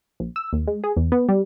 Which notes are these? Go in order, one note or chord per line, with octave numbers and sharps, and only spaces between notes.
A#1
E6
D#2
G#3
G#4
E2
B3
G3